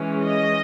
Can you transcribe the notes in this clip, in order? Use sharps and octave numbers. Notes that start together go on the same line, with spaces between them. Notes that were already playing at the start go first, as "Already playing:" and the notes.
Already playing: E3 G#3 C#4
D#5